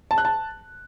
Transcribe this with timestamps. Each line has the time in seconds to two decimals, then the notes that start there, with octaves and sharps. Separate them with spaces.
0.11 A5
0.18 F#6
0.25 A5